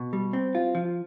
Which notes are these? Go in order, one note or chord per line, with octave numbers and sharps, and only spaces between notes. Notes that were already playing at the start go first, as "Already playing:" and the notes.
Already playing: B2
G3
C4
F4
F3